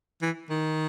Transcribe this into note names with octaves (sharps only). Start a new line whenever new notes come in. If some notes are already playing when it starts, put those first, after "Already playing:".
E3
D#3